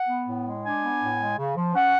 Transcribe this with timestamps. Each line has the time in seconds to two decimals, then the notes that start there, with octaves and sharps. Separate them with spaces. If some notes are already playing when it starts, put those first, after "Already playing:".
Already playing: F#5
0.08 B3
0.26 A2
0.45 G#3
0.63 D4 G#5
0.82 B3
1.00 A2
1.19 G#3
1.37 C#3
1.56 F3
1.74 C#4 F#5